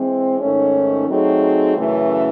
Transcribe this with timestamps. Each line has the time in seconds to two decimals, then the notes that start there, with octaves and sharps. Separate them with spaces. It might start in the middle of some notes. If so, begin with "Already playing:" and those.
Already playing: E3 G#3 C4
0.40 G#2 D#3 A3 C#4
1.08 F#3 A3 C4 D#4 G#4
1.75 F#2 C#3 E3 A3